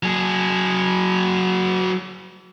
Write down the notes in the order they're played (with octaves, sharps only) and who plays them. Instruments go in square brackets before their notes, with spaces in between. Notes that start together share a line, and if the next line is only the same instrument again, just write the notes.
[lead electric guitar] F#3 G#4